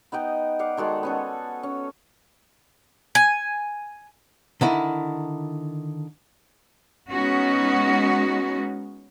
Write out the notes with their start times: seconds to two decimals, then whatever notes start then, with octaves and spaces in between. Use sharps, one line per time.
0.12 B3 D#4 D#5 G5
0.59 D5 F5 F#5
0.77 D#3 G#3 F#4 A4
1.03 B3 C#4 A4
1.63 C#4
3.15 G#5
4.61 D3 D#3 E4
7.11 G#3 B3 C#4 D#4 F#4